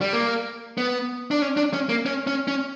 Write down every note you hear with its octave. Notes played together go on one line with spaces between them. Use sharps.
G3
A#3
B3
D4
C#4
D4
C#4
A#3
C#4
C#4
C#4